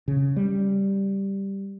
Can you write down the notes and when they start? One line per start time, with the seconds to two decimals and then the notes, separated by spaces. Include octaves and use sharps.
0.08 C#3
0.36 G3